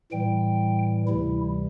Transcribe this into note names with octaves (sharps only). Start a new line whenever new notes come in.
A2 E3 G3 G5
D2 C3 E3 G3 E4